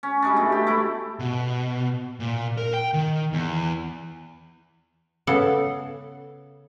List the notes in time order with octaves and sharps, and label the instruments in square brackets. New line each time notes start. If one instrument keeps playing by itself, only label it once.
[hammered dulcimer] C#4
G3 G#3 D4
B2 A3
G4
A3 E4 B5
[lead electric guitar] B2
A#2
A#4
G5
D#3
E2
[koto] C#3 B3 A4